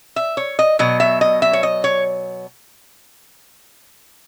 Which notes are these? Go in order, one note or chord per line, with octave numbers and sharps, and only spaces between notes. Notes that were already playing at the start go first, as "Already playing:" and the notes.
E5
C#5
D#5
B2 F#3 D#5
E5
D#5
E5
C#5
D#5
C#5